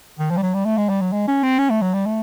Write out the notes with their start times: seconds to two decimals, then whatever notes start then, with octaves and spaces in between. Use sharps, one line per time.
0.19 D#3
0.30 F3
0.37 G3
0.43 F#3
0.54 G3
0.65 A3
0.77 G#3
0.89 G3
1.01 F#3
1.12 G#3
1.27 C#4
1.43 C4
1.59 C#4
1.70 A3
1.82 F#3
1.94 G3
2.06 A3